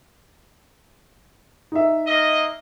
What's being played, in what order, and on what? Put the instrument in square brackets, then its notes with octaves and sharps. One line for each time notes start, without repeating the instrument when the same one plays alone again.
[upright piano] D#4 E5
[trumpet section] A#3 D#5